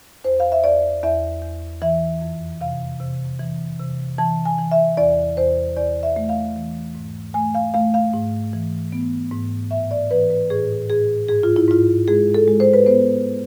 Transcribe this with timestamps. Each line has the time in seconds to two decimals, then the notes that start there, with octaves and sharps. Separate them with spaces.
0.24 E2 C5
0.40 F5
0.52 E5
0.64 E2 D5
1.03 E2 E5
1.42 E2
1.82 E3 E5
2.21 F2
2.61 C3 F5
3.00 C3
3.40 E3
3.79 C3
4.18 E3 A5
4.45 G#5
4.58 E3
4.71 E5
4.97 E2 D5
5.37 E2 C5
5.77 E2 D5
6.03 E5
6.16 A3
6.29 F5
6.56 E3
6.95 G#2
7.34 A3 G#5
7.55 F5
7.74 A3 F5
7.94 F5
8.13 G#2
8.53 E3
8.92 B3
9.32 G#2
9.71 A2 E5
9.91 D5
10.11 E3 B4
10.30 B4
10.50 A2 G#4
10.90 A2 G#4
11.29 G#2 G#4
11.43 F4
11.56 E4
11.68 G#2 F4
12.08 G#3 G#4
12.35 A4
12.48 G#3
12.60 C5
12.73 B4
12.86 B3 C5